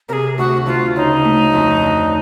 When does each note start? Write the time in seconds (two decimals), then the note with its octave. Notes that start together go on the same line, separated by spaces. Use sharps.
0.09 C3 G#4 A#4
0.38 D2 F#4
0.66 D2 F4
0.96 C#3 D#4
1.25 A3
1.53 F2
1.83 D3